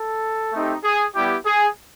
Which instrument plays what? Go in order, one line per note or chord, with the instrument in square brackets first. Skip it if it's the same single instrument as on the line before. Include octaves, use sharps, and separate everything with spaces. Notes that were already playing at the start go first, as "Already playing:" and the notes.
Already playing: [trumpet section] A4
A3 C4 D#4 G4
G#4
G3 B3 E4 G4
G#4